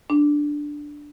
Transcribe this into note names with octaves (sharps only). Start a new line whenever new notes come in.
D4